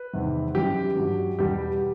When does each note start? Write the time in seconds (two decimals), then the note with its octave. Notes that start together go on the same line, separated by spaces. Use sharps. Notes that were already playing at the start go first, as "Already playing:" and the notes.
Already playing: B4
0.13 E2 C3 D#3 G3
0.55 F#2 E3 G3 G4
0.97 G2 F#3
1.39 E2 B2 G3 G4